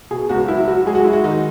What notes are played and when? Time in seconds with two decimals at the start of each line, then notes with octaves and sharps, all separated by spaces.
0.11 B2 G#4
0.29 C#2 F#4
0.48 F#3 E4
0.67 F#3 F#4
0.86 G#3 G#4
0.95 F#4
1.04 G#3 E4
1.13 F#4
1.24 D#3 D#4